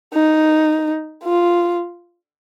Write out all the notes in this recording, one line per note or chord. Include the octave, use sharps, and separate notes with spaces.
D#4
F4